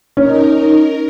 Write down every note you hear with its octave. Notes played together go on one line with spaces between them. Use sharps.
C#4 D#4 A#4
A#4